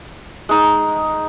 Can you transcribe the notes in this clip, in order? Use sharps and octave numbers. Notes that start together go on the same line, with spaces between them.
G#3 D#4